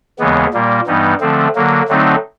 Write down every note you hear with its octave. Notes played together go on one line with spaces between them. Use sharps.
D#2 C#3 E3 G#3 B3
A#2 G3 A#3
G2 E3 G3 B3 D#4
D3 F3 A3 C4
D3 F#3 A#3
D3 F#3 A3 C4 D#4